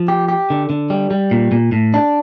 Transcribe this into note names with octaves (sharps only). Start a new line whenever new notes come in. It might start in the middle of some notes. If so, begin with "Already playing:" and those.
Already playing: F3
G4
G4
D3
D3
G3
G3
A#2
A#2
A2
D4